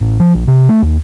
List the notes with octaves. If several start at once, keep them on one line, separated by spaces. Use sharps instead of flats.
A1
F3
A#1
C3
A3
D#2